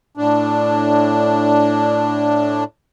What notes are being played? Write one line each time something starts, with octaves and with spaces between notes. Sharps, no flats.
A2 D4